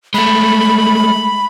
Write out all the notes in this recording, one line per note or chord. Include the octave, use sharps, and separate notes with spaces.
G#3 A3 B5